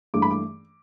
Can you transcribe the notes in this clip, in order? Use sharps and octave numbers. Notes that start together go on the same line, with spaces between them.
G2 E3 A3 D6
B5
D6